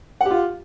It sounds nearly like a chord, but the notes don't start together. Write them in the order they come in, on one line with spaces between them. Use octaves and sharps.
F#5 G4 F4